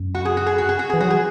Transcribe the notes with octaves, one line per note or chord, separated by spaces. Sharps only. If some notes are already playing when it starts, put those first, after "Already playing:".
Already playing: F#2
F#4
G#4
F#4
G#4
F#4
G#4
F#4
E3 G#4
F#3 F#4
E3 G#4